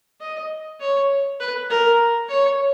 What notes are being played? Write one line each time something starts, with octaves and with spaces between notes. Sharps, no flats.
D#5
C#5
B4
A#4
C#5